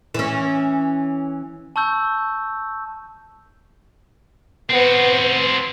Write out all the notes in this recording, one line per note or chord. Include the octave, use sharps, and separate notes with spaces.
E3 C#4
A5 C#6 E6 G6
B3 C4 F#4 C5